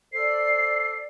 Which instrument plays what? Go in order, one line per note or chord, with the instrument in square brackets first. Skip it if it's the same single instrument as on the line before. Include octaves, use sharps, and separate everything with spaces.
[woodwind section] A4 C5 D5 [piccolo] C7